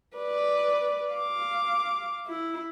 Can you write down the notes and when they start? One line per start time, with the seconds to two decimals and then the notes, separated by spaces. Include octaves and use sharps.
0.17 B4 D5
1.14 F5 D6
2.26 E4